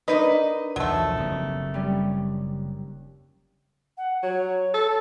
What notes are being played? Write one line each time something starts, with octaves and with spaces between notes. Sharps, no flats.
D4 D#4 A#4 B4 D#5
B1 E2 D#3 F3 F#3 A3
F#1 D#2 C#3 C4
G3 C#4
F#5
F#3 C#5
A4